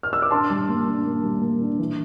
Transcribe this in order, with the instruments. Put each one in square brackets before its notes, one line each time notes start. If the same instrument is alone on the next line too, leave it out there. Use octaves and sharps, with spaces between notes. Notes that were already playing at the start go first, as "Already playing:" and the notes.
[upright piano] F6
E6
D6
D4 A5 C6
G3
A#3
D4
A#3
G3
A#3
D4
E3